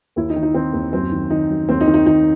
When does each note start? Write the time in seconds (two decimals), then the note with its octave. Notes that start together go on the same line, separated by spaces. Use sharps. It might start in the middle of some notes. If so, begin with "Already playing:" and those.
0.16 D#2 E4
0.30 D#4
0.36 D#3
0.43 D#4
0.54 D#3 C4
0.73 D#2
0.93 F#2 C4
1.12 D#3
1.30 D#3 D#4
1.50 F#2
1.68 D#2 C4
1.81 D#4
1.87 D#3
1.94 D#4
2.06 D#3 D#4